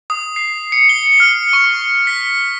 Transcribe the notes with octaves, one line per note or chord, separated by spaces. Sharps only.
D#6
C7
C#7
G7
F6
C#6
B6